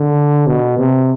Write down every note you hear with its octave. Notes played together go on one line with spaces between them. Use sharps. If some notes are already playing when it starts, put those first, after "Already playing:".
Already playing: D3
B2
C3